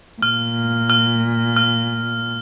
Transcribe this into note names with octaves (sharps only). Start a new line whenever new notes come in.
A#2 F6
F6
F6